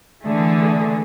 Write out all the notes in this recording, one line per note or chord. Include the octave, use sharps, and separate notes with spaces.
D3 E3 A3 G#4